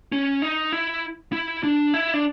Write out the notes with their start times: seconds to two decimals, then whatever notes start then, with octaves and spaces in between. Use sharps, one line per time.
0.12 C#4
0.42 D#4
0.73 E4
1.32 E4
1.63 D4
1.94 E4
2.13 D4